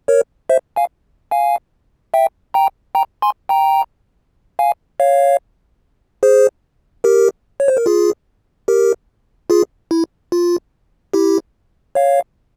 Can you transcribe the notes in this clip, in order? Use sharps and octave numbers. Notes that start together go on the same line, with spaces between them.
A#4 C#5
C5 E5
F5 G#5
F5 G#5
E5 G5
G5 A#5
G5 A#5
G#5 C6
G5 A#5
F5 G#5
C#5 F5
G#4 C5
G4 A#4
C#5
C5
A#4
F4 G#4
G4 A#4
F4 G#4
E4
F4
E4 G4
C#5 F5